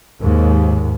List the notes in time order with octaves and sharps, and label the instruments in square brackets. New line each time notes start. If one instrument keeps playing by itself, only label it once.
[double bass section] D#2 G#2